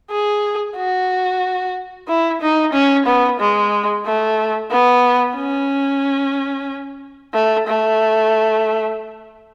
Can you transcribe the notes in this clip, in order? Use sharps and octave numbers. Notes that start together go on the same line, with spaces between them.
G#4
F#4
E4
D#4
C#4
B3
G#3
A3
B3
C#4
A3
A3